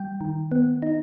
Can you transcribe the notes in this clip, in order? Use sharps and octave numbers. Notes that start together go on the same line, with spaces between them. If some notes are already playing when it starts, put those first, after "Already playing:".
Already playing: G3 G5
D#3
B3
D#4